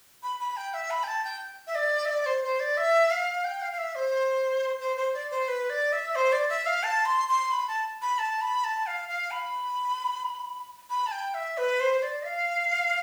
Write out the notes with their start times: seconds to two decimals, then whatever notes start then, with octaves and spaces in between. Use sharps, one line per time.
0.23 B5
0.40 B5
0.57 G5
0.74 E5
0.90 B5
1.03 G5
1.08 A5
1.24 G5
1.67 E5
1.75 D5
2.05 E5
2.09 D5
2.26 C5
2.43 C5
2.60 D5
2.77 E5
3.11 F5
3.44 G5
3.62 F5
3.72 F5
3.78 E5
3.95 C5
4.80 C5
4.97 C5
5.14 D5
5.31 C5
5.48 B4
5.70 D5
5.93 E5
6.15 C5
6.32 D5
6.49 E5
6.66 F5
6.83 A5
7.05 C6
7.29 C6
7.51 B5
7.68 A5
8.02 B5
8.19 A5
8.41 B5
8.64 A5
8.87 F5
9.09 F5
9.31 B5
10.90 B5
11.06 A5
11.12 G5
11.34 E5
11.58 B4
11.80 C5
12.02 D5
12.25 F5